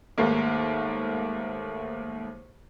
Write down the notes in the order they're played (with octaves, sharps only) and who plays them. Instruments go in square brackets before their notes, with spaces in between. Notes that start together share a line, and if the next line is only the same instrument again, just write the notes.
[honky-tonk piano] D#2 G#2 A3 A#3